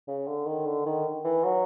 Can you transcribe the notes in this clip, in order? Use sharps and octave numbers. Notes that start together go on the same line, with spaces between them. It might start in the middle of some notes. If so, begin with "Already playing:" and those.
C#3
D3
D#3
D3
D#3
E3
F#3